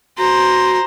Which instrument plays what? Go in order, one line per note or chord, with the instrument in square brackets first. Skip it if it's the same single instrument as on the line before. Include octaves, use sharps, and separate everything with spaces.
[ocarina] F#4 [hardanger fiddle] C5 A#5